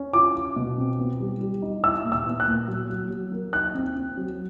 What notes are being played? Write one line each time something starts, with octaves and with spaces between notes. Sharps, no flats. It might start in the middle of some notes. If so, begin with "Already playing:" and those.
Already playing: C#4
F4 D6
F4
B2
C4
B3
G3
G3
D#4
E4 E6
A#2
E6
B3
F#6
A#2
F#3
F#3
F#3
A#3
D#4 F#6
C4
C4
F#3